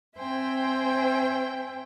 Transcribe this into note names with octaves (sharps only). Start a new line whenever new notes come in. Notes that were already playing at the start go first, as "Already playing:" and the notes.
C4 C5 E5 G5 G#5